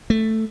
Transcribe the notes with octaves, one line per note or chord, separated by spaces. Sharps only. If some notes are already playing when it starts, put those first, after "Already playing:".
A3